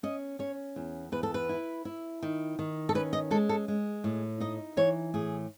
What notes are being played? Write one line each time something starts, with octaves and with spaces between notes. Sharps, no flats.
C#4 D#5
C#4 C#5
E2
E2 B4
A4
B4
E4
E4
D#3
D#3
A4
C#4 B4
D#5
G#3 A4
A4
G#3
A2
D#4 D#5
E3 C#5
A2 G#4